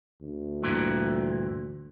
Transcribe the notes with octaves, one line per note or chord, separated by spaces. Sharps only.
D2
G2 A#2 E3